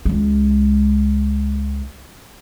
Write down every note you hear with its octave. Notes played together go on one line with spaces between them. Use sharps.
C#2 G#3